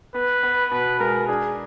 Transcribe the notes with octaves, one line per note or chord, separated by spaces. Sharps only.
B3 B4
B3
B2 B4
G#3 A#4
D4 G#4